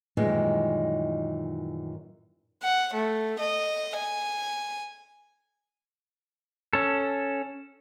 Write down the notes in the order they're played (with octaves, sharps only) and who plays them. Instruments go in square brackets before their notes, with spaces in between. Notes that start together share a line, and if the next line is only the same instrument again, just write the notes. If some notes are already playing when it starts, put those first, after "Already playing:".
[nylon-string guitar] F#2 A#2 D#3 E3 G3 G#3
[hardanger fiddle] F#5
A3
D#5
G#5
[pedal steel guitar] C#4 A4